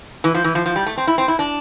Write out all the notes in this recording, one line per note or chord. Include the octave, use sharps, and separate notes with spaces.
E3
F3
E3
F3
F3
G3
A3
C4
E4
C4
E4
D4